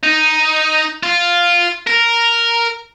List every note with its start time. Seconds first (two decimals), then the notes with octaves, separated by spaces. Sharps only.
0.03 D#4
1.03 F4
1.87 A#4